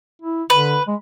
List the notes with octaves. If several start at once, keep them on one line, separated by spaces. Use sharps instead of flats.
E4
D3 B4
G#3